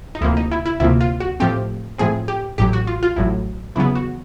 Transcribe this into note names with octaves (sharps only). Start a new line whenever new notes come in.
D#4
D2 C3 F3 A#3 E4
D#4
E4
E4
D2 C3 F3 A#3 E4
F4
F#4
A2 F3 A3 C4 G4
A2 F3 A3 C4 G#4
G4
A1 A2 F#3 G4
F#4
F4
F4
A1 A2 F#3 E4
E2 C#3 F#3 B3 E4
F#4